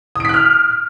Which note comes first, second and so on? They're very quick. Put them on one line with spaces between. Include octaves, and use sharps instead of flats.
D#6 D7 B6 F#6 F6